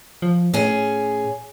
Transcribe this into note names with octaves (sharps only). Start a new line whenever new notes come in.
F3
A2 C#4 G#4